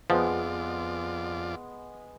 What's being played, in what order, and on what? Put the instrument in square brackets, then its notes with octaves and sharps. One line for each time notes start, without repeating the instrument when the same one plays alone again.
[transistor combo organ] F2 F4 D5 [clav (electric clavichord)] F3 [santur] G#3 B3